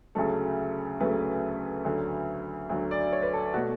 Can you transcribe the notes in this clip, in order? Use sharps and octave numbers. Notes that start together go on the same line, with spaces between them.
D2 C#3 F#3 A3 A4
D2 C#3 F#3 A3 B4
D2 D3 F#3
D2 D3 F#3
D5
C#5
B4
A4
B2 A3 F#4